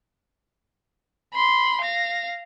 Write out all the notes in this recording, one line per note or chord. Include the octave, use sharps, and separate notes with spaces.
B5 C6
F5 A#6